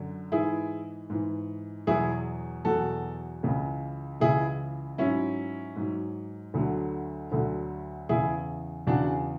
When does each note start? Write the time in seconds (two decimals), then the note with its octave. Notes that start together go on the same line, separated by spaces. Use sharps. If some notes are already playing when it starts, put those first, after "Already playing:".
Already playing: F#2 D3 F#3
0.32 G#2 E3 E4 G#4
1.10 G#2 E3
1.87 E2 B2 F#3 E4 G#4
2.65 E2 B2 F#3 F#4 A4
3.43 C#2 C#3 E3
4.20 C#2 C#3 E3 E4 G#4
4.98 G#2 F#3 C#4 E4
5.76 G#2 F#3
6.54 D2 D3 F#3
7.32 D2 D3 F#3
8.09 E2 C#3 E3 E4 G#4
8.87 E2 C#3 E3 D4 F#4